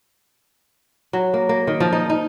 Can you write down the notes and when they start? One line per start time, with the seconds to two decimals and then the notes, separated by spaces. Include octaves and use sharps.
1.13 F#3
1.34 A#3
1.49 A#3
1.67 D#3
1.80 F3
1.93 D#4
2.10 D#4